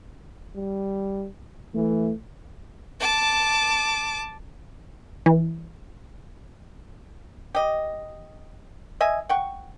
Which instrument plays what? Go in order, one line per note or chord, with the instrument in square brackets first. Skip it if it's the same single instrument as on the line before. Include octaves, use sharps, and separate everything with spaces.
[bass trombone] G3
[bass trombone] E3 [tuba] A3
[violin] A5 D6
[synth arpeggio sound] E3
[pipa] G4 D#5
D#5 E5 G#5
F#5 G5 C#6